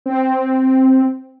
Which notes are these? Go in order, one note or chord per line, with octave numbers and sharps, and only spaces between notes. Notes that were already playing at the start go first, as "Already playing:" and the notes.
C4